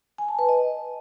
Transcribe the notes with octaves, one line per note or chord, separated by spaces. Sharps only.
G#5
A5
B4
D#5